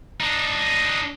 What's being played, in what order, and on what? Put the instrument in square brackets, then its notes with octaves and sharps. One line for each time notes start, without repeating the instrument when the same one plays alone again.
[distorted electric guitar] D4 D#4